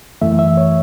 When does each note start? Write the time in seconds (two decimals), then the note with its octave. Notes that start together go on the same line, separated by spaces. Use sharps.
0.22 F#2 E3 A3 E5
0.39 E5
0.57 C#5